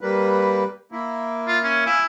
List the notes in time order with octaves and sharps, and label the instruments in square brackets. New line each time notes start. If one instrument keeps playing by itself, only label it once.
[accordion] G3 A#3 B4
A#3 E4
[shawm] F4
C#4
[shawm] E4 [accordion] F5 G#5 D6